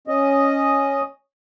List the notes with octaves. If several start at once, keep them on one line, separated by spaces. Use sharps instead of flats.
C#4 D#5